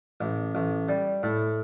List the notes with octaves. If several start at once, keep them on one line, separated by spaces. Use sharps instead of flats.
A1
A1
G3
A2